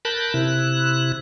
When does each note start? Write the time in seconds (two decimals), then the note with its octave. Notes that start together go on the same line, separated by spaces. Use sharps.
0.05 A#4 A5 B5 F#6 G6
0.34 C3 E4 F#6